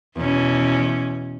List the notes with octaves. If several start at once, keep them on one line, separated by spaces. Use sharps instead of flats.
E2 B2 C#4